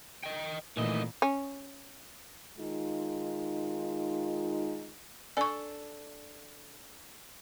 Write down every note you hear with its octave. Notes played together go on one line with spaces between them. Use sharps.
D#5 G5
C2 A#2 D#3 E3 A3 D#5
C#4
D#3 G#3 D#4 F4
D4 A4 D5 G#5 C#6